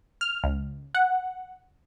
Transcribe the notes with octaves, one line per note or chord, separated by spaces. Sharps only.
F6
C#2
F#5